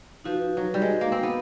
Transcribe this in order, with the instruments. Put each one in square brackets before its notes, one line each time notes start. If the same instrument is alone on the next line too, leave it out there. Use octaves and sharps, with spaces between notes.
[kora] F3 [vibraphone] D#4 F#4 B4
[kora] F#3
G3
G#3
A#3
C4
B3